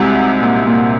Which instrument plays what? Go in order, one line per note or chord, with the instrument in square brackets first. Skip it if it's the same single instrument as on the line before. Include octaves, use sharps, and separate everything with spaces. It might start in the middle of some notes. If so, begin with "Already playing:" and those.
Already playing: [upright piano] C2 C3 [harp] G#3 F#4
[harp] D#4
A#2
A#2